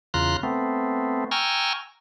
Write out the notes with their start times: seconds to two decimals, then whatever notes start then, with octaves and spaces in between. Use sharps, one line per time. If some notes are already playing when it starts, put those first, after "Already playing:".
0.14 E2 C#3 F4 A#5 C6 F#6
0.43 A3 B3 C4
1.31 G5 G#5 A#5 C#6 E6 F6